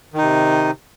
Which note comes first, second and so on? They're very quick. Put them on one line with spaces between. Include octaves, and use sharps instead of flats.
D#3 D#4 C3